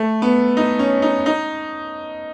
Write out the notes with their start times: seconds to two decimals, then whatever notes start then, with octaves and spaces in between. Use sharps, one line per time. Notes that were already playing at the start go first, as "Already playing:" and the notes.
Already playing: A3
0.22 B3
0.57 D#4
0.79 C#4
1.02 D#4
1.26 D#4